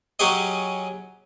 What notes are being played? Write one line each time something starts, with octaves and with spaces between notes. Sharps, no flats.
F#3 C#4 G4 G#4 C#5 D#5